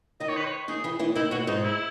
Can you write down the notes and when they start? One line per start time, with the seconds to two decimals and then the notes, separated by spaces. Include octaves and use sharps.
0.20 D#3 D#4 D#5
0.29 C#5
0.37 B4
0.45 C#5
0.68 D#3 D#4 G#4
0.84 E3 E4
0.99 E3 E4
1.15 D#3 D#4 E4
1.31 B2 B3 F#4
1.47 G#2 G#3 D#4
1.64 E4